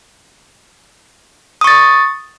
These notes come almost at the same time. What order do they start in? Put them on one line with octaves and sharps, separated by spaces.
D#6 C#6 A6